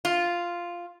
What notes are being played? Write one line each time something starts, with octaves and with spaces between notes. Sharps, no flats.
F4